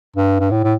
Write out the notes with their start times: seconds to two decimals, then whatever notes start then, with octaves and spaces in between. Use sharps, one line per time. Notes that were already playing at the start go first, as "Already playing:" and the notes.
0.16 G2
0.40 G2
0.51 A2
0.64 A2